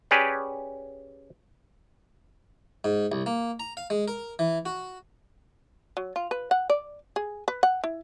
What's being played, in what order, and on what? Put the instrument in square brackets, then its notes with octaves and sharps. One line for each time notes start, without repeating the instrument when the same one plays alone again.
[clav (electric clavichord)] C#4 G4 G#4 B4 D5
[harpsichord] G#2
C2
A#3
A#5
F5
G#3
A#4
E3
F#4
[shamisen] F#3
F4
B4
F#5
D5
G#4
B4
F#5
E4